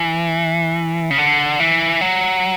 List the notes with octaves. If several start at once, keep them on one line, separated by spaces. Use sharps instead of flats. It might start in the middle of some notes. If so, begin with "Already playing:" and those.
Already playing: E3
C#3
D3
E3
F#3